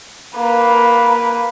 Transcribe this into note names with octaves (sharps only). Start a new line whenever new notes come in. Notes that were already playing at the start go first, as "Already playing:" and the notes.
A#3 B4